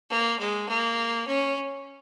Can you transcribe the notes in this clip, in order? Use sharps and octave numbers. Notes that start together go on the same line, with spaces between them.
A#3
G#3
A#3
C#4